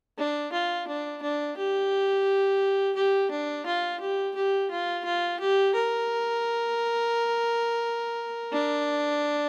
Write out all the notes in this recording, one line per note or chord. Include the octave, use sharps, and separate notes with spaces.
D4
F4
D4
D4
G4
G4
D4
F4
G4
G4
F4
F4
G4
A#4
D4